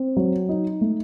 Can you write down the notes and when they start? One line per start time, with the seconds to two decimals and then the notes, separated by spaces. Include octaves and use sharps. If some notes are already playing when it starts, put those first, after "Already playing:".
Already playing: C4
0.17 F#3
0.49 D#4
0.81 A3